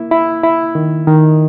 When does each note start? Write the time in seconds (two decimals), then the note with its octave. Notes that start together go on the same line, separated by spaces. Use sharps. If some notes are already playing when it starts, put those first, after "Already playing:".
Already playing: A#3 E4
0.11 E4
0.44 E4
0.75 D#3
1.07 D#3